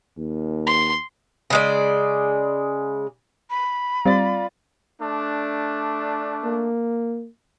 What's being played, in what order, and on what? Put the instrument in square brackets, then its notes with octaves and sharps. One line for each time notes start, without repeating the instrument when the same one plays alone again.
[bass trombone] D#2
[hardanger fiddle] C6
[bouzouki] C#3 G#3 D5
[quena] B5
[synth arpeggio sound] G3 C4 [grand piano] F4 D5 A6
[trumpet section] A3 D4
[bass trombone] A#3